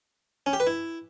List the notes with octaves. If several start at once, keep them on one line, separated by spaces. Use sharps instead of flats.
C#4
G4
B4
E4